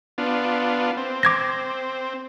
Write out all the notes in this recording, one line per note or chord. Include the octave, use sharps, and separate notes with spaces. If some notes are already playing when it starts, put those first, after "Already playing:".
B3 D4 F4
C4
D6 G#6 A#6